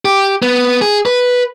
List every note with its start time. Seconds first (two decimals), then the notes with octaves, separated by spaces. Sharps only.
0.05 G4
0.42 B3
0.81 G#4
1.06 B4